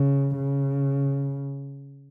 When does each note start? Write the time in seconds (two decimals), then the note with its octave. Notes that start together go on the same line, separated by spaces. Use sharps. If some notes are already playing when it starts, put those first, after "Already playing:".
Already playing: C#3
0.36 C#3